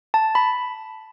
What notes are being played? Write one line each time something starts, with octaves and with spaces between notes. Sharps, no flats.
A5
B5